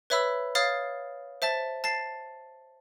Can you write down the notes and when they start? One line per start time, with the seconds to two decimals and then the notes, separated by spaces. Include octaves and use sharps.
0.10 B4 C#5 E5 B5 E6
0.55 C#5 F5 D#6 F6 A6 C7
1.42 C5 E5 A5 A6
1.84 A5 A6 C7